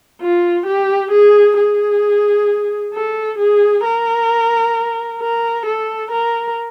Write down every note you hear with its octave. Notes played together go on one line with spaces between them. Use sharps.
F4
G4
G#4
G#4
A4
G#4
A#4
A#4
A4
A#4